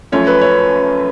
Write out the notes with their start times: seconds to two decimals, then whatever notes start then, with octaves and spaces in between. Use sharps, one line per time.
0.12 F#2 F3 A3 C#4 C#5
0.27 B4
0.41 C#5